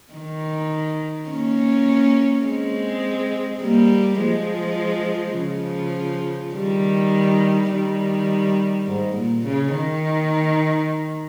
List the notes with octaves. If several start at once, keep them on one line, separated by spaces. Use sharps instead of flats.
D#3
A#3 C#4
G#3 C4
G3 A#3
F3 G#3
C#3 F3
D#3 G3
D#3 G3
G#2
A#2
C#3
D#3